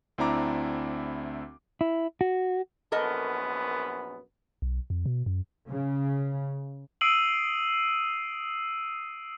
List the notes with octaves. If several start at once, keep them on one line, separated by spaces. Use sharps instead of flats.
D2 C4 D4 E4 A#5 D6
E4
F#4
A#1 F#2 B3 A4 A#4 D#5
B1
F2
B2
F#2
C#3
D#6 E6 C7 D7 D#7 F#7